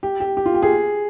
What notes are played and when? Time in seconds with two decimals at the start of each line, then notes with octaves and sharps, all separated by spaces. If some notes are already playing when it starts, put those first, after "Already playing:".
0.03 G4
0.20 G4
0.37 G4
0.46 F4
0.54 G4
0.62 G#4